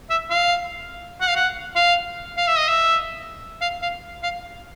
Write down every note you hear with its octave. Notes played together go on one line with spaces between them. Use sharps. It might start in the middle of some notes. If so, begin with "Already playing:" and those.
E5
F5
F#5
F5
F#5
F5
F5
E5
D#5
E5
F5
F5
F5